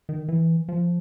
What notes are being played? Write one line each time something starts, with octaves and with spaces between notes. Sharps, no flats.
D#3
E3
F3